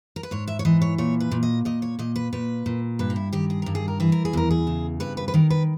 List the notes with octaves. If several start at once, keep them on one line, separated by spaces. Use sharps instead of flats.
A#4
B4
G#2 C#5
E5
C#5
E3 D#5
C#5
A#2 C#5
B4
A#2
D#5
A#2 D#5
C#5
A#2 D#5
B4
A#2 B4
A#2
G2 B4
D#4
E4
D#3 G4
G#4
G2 A#4
G#4
A#4
E3 G#4
A#4
G#4
E2 A#4
G#4
C#3
G2 B4
B4
B4
D#3 A#4
B4